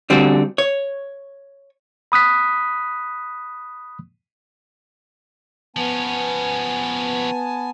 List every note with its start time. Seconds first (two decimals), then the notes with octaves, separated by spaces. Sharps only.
0.10 D3 G3 C4 F#4
0.58 C#5
2.12 B5 D#6 F#6 B6
5.76 F3 B3 C#4 G#5 A5